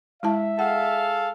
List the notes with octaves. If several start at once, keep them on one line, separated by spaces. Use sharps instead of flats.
G#3 E4 E5 A5
G#4 A4 F5 F#5